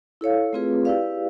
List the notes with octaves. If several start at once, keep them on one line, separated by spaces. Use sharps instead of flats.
E4 A4 C#5 F5
A3 C4 F4 G#4 B4
E4 G4 B4 D5 F5